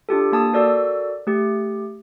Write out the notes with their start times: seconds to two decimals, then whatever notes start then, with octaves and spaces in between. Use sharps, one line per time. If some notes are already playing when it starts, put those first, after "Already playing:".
0.09 D4 F4 G4 A4
0.32 A#3 A5 D#6
0.53 F#4 A4 A#4 D5 D6 E6
1.27 A3 G4